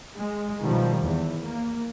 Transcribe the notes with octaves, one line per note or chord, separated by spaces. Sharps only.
G#3
B2 D#3 F3 G3
E2
A#3